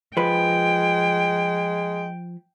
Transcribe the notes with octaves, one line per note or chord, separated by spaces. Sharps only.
F3 G#3 B4 G5